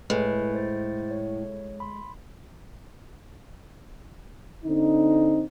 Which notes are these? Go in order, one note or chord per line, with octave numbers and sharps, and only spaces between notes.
A2 G#3 B4 G#5
C5 A6
C#5
B5 C6
D3 C4 D#4